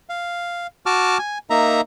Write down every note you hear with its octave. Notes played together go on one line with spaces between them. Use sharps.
F5
F#4 A5 D6 F6
G#5
A#3 D#4 E5 A#5